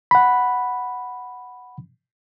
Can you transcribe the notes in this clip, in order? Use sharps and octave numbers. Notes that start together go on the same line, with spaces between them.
F#5 B5